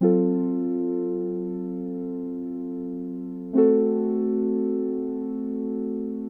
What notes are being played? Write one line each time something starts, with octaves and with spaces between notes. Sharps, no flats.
F#3 C4 F4 A4
A3 C4 F#4 A4